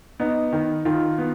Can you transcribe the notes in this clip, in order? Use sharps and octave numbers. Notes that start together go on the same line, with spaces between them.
B3 D#4
D#3
D#3 F4
B3